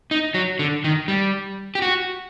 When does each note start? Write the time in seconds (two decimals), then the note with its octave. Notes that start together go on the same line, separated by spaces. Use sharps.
0.11 D#4
0.34 F#3
0.59 D3
0.84 D#3
1.08 G3
1.75 G4
1.82 F#4